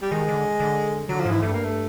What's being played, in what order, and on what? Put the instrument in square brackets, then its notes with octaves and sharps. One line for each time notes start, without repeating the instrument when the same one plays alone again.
[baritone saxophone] G3
[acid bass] D#3 [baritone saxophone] G#3
[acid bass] D3
D3
[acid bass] D3 [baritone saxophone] F#3
[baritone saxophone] F3
[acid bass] G#2
[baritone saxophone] E3
[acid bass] G2 [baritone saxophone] A3
[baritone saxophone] A#3
A3